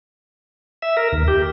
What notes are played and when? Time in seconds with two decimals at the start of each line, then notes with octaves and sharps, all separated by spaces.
0.82 E5
0.97 A#4
1.12 D#2
1.28 G4